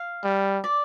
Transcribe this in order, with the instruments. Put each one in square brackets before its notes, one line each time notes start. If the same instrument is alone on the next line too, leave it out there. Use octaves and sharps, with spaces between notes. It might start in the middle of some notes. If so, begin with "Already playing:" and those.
Already playing: [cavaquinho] F5
[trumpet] G3
[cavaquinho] D5